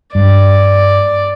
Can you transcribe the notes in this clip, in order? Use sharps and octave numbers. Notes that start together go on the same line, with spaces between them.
G2 D5